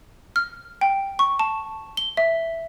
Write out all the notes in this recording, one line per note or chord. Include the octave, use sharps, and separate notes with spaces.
F6
G5
C#6
A5
G7
E5